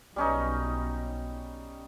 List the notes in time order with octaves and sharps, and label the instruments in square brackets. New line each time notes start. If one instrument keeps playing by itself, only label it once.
[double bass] B1 [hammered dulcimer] G3 C#4 D#4